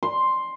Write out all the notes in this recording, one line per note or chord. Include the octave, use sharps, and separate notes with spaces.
C6